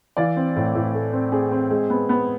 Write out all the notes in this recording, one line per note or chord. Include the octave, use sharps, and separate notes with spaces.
E3 D5 F5
C4
A2
A2
A3
C4
C4 G#4
C4
G#3
B3
B3